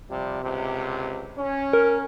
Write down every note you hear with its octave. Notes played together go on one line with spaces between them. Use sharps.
C3 F3 G3
C#2 C3
C#4
A#4